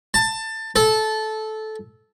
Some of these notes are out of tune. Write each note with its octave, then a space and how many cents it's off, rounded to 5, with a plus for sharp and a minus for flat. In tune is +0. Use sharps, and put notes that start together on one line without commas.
A5 +20
A4 -15